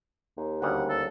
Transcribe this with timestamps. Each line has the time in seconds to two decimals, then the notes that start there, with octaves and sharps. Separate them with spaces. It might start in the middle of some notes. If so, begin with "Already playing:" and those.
0.37 D#2
0.62 D2 C#3 G3 F#5
0.89 A4